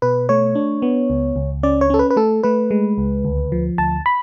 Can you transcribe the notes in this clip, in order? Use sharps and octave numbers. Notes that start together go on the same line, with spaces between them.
B2 B4
A3 C#5
D4
B3
C#2
C#2
C#4 D5
C#5
C#4 A4
B4
B4
A3 A4
A3 B4
G#3
C#2
D2
F3
D2 A5
B5